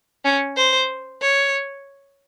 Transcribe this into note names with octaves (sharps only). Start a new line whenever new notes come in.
C#4
C5
C#5